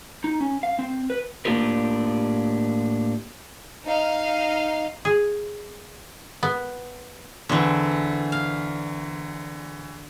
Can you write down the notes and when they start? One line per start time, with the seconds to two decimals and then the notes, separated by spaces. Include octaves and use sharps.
0.24 D#4
0.41 C#4
0.63 F5
0.79 C4
1.10 B4
1.45 A2 A#3 D4 F4 G4 A#4
3.84 D#4 F5
5.05 G#4
6.43 B3
7.49 E2 D3 E3 C4
8.32 F5